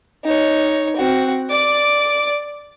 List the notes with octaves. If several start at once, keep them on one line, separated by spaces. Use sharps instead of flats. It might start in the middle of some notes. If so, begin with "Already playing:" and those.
D#4 C#5
C4 F#4
D5 D6